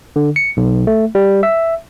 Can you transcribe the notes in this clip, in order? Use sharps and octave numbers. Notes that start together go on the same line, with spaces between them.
D3
C#7
B1
A3
G3
E5